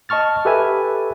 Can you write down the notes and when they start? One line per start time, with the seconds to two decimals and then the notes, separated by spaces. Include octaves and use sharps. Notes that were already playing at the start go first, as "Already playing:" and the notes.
0.09 D#5 A5 C#6 F6 A6
0.45 G4 A4 B4 E5 G#5